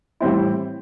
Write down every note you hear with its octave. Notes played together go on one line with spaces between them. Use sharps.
A2 E3 G3 C4 E4